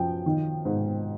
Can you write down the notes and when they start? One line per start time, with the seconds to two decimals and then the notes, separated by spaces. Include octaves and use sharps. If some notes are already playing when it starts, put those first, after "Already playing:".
Already playing: F#2 F3 G5
0.26 D#3
0.65 G#2